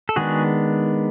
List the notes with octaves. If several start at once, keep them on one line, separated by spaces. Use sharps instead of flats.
A4
D#3 G#3 B3 D4 F#4 G#4